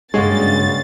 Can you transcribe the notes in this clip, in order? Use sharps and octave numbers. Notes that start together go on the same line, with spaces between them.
G2 C#3 G#3 A#3 F#4 C#5 A6